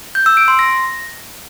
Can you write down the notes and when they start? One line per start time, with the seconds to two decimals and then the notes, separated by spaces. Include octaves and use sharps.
0.15 G6
0.26 E6
0.37 D7
0.48 C6
0.59 A#6